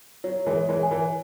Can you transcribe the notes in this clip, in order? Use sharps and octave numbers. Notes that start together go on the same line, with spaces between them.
F#3 C#5
E3 G#3
C#5
E3 G#3
G#5
E3